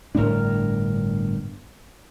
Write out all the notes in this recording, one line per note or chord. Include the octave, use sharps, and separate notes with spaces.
G1 A2 D4 A#4